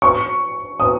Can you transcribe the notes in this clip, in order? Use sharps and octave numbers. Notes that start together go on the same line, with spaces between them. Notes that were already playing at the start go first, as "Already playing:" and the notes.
C#6
D#6